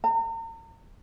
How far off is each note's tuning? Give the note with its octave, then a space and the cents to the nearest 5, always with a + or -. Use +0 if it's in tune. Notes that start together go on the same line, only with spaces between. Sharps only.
A#5 -40